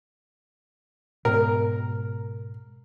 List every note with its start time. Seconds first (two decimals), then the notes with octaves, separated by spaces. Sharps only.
1.25 G#2 B2 A#4